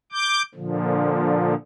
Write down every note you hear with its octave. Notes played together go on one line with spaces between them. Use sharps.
D6 G6
A#2 D3 F3